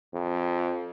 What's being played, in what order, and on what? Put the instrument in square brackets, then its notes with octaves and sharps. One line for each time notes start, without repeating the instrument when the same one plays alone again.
[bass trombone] F2